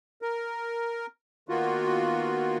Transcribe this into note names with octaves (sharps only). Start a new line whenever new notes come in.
A#4
D#3 A#3 B3 F4 F#4